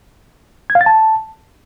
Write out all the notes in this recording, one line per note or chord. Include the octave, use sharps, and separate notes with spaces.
G#6
F5
A6
A5